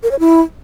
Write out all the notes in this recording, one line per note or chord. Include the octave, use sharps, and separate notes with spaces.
A#4
C#5
E4